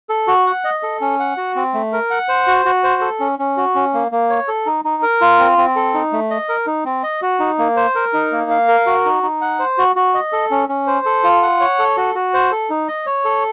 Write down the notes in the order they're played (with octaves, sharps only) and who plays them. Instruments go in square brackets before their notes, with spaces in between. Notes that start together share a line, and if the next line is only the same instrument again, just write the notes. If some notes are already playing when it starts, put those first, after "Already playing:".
[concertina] A4
F#4
F#5
D#5
A4
C#4
F#5
F#4
C4
A3
A#4
F#5
C5
F#4
F#4
C5
A4
C#4
C#4
F#4
C#4
A#3
A#3
C#5
A4
D#4
D#4
A#4
F4
C4
C4
A4
D#4
A3
D#5
A#4
D#4
C4
D#5
F#4
D#4
A#3
C5
A#4
D#4
A#3
F5
A#4
F#4
D#4
D#4
F#5
C5
F#4
F#4
D#5
A4
C#4
C#4
C5
A4
F4
F#5
C#5
A4
F#4
F#4
C5
A4
D#4
D#5
C#5
A4